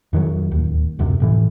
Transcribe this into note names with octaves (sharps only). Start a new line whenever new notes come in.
F2 D#3 F3 F#3
D1 D#2
D1 F#2 C3
F1 A2 E3